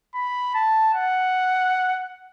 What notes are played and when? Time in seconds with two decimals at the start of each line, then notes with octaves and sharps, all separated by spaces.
0.14 B5
0.55 A5
0.95 F#5